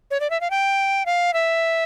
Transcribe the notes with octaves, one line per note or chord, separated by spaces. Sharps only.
C#5
D5
E5
F5
G5
F5
E5